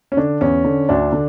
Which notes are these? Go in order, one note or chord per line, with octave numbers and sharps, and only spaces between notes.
C#4
D3 D4
E2 C#4
D3
D2 D4
D3